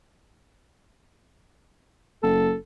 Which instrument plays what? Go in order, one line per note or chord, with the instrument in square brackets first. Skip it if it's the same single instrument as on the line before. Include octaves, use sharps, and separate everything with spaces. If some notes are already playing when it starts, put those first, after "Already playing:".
[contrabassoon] F#1 [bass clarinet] A4